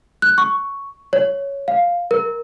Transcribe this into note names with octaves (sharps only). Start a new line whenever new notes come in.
F#6
C#6
C#5
F5
A#4